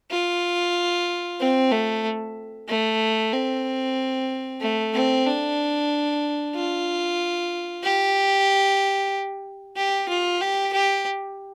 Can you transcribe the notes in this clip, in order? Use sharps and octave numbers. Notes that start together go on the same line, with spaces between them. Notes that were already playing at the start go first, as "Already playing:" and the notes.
F4
C4
A3
A3
C4
A3
C4
D4
F4
G4
G4
F4
G4
G4